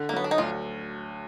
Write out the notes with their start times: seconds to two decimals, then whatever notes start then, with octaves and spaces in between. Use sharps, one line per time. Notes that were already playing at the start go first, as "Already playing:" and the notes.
Already playing: D3
0.09 A#3
0.13 F#3 B3
0.24 D4
0.31 D#4
0.38 D2 F4